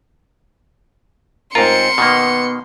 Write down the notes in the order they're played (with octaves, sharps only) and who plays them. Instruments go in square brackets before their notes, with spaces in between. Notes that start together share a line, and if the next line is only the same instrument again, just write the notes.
[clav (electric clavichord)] G#2 F4 [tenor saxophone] C4 [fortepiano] A#4 [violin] C6 C#7
[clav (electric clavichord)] B2 D#3 A#3 [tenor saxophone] B3